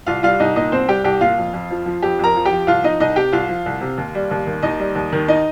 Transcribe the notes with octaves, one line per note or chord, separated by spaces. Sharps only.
C2 F4 F5
G3 F4 F5
C2 D#4 D#5
A#2 D#4 D#5
C2 C4 C5
G3 G4 G5
C2 G4 G5
A#2 F4 F5
F2
F2
F3
F3
F2 G4
F2 A#4 A#5
F3
G4 G5
F3
C2 F4 F5
F3 D#4 D#5
C2 D#4 D#5
C3 G4 G5
C2 F4 F5
F3
C2
C3
D#2
G3
D#2
D#3
D#2 D#4 D#5
G3
D#2
D#3
D#4 D#5